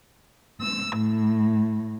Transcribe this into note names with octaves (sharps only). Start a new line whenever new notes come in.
E6
A2